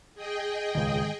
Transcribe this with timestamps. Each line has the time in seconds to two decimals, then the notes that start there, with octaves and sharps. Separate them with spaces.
0.15 G#4 D#5 G5
0.75 D#1 C#2 G#2 D#3